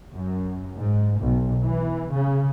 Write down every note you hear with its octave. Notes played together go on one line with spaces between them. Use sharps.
F#2
G#2
B1
E3
C#3